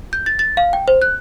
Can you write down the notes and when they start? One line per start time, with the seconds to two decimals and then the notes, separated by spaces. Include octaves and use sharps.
0.13 G6
0.26 A6
0.39 A6
0.57 F5
0.73 G5
0.88 C5
1.02 F#6